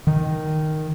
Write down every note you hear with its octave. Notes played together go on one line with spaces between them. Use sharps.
D#3